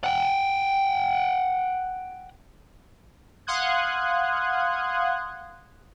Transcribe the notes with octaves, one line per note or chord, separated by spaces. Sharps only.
F#5 G5
F5 F#5 C6 D#6 F#6 G#6